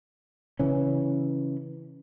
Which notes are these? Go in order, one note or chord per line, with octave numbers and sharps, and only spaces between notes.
C#3 E3 C#4